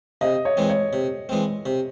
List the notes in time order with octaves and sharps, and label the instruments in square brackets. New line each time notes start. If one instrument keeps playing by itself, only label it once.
[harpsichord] C3 [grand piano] D#5
[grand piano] C#5
[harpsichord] E3 G#3 C4
[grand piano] C#5
[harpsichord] C3
E3 G#3 C4
C3